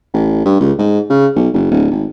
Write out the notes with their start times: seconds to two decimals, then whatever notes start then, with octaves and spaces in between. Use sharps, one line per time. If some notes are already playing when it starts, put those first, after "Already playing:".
0.14 A1
0.45 G2
0.60 C#2
0.79 G#2
1.10 C#3
1.36 B1
1.54 F#1
1.71 D1
1.91 G#1